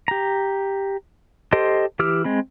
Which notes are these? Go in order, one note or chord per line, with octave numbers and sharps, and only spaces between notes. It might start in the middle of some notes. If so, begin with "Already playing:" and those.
G4 A#5
G4 A4 C5 D#5 C6
E3 G4 D6 E6 F6
G#3 C4 B5